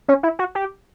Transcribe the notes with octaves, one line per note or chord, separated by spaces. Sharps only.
C#4
E4
F#4
G4